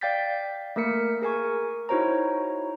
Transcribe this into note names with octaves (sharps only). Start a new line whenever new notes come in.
D5 F5 G5 G6 A6 B6
A3 A#3 A#4 B6 C#7
G#4 A#4 G#5 C#6
D#4 E4 F#4 C5 C#5 A#5